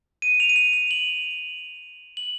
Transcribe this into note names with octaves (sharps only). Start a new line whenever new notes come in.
D#7
F7
D#7
F7
F7
F#7
F#7